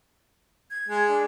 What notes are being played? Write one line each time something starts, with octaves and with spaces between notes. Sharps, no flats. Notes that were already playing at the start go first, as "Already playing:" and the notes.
G#6
G#3
D4